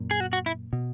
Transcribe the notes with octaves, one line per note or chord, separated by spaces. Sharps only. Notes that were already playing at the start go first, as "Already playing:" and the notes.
Already playing: F#2 A#2
G#4
F#4
F#4
E4
B2